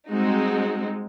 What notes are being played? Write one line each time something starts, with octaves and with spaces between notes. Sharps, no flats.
G3 G#3 C4 D#4 F#4